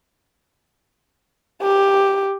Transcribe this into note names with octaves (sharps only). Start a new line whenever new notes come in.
G4